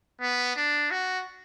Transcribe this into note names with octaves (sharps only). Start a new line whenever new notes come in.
B3
D4
F#4